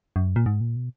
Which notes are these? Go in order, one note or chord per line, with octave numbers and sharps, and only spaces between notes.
F#2
A#2
G#2
A#2
B2